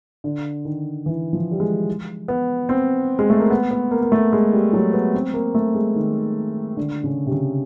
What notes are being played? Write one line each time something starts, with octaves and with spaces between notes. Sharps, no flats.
D3
D#3
E3
F3
G3
G#3
B3
C4
G#3
A3
A#3
B3
B3
A#3
A#3
A3
G#3
G3
F#3
B3
C4
A#3
A3
G#3
D#3
D3
C#3
C3
C#3